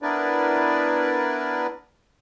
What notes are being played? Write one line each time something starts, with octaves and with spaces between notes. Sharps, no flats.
B3 D4 E4 A#4 B4 D5